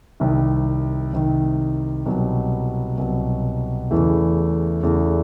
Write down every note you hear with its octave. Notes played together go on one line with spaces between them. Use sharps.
C2 C3 D#3
C2 C3 D#3
C2 B2 F#3
C2 B2 F#3
E2 C#3 E3 A3
E2 C#3 E3 A3